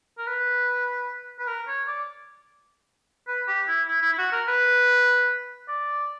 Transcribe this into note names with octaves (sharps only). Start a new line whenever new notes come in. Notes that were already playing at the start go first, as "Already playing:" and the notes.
A#4
B4
B4
A#4
C#5
D5
B4
G4
E4
E4
E4
E4
F#4
A#4
B4
D5